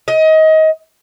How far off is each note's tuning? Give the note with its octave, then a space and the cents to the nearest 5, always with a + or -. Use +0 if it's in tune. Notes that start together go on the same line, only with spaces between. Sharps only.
D#5 +25